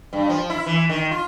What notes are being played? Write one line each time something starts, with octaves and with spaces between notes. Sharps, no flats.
G2
F3
E4
E3
D#3
F4